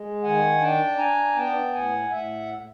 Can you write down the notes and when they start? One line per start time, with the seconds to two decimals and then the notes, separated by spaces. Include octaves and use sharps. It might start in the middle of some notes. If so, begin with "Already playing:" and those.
Already playing: G#3
0.23 D#3 F#5 G#5
0.61 D4 G5 A5
0.98 D4 G#5 A#5
1.36 B3 G5 A5
1.73 A2 F#5 G#5
2.10 A2 E5 F#5